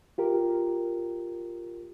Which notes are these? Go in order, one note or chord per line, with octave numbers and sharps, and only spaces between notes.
F4 G4 A#4